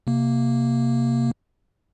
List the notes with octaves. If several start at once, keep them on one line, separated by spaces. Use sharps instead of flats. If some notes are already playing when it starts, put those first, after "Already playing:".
C3 A#3